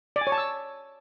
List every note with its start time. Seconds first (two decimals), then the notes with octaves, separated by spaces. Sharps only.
0.16 D5
0.21 G#5
0.27 C#5
0.32 A5
0.38 E6